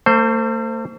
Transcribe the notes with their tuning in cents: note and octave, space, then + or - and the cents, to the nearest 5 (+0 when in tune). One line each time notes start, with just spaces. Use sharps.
A3 +45 C5 +0